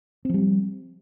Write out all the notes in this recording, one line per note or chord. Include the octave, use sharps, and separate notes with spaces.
F3 G3 C4